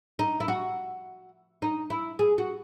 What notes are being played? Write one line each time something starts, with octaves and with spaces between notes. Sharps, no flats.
D#4
E4
F#4
D#4
E4
G#4
F#4